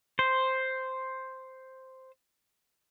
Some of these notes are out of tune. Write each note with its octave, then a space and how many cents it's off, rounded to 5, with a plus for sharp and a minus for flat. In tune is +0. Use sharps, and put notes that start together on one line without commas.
C5 +0